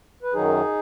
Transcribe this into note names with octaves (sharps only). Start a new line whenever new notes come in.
B4
F#2 D#3 F#3 D#4 G#4